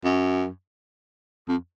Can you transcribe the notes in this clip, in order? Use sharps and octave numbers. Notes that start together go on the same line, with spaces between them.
F#2
F2